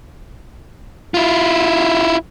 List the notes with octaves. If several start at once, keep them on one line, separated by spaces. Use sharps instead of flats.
E4 F4